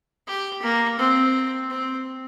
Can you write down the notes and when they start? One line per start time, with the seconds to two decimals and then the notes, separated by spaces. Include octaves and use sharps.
0.27 G4
0.62 A#3
0.98 C4
1.70 C4